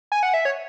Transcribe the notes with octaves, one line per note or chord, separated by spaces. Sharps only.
G#5
F#5
E5
C#5